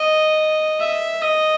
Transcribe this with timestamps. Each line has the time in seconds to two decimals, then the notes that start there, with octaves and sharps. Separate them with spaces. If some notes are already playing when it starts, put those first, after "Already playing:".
Already playing: D#5
0.80 E5
1.22 D#5